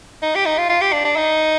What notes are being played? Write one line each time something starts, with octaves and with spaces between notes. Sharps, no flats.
D#4
G4
D#4
F4
F4
G4
D4
D4
D#4